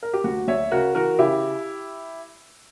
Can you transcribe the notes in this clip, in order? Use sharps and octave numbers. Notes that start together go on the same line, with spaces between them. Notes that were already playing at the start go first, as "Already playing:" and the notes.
A#4
G4
D2 F#4
D2 C#5 E5
C#3 F#4 A#4
E3 F#4 A#4
C#3 E4 G4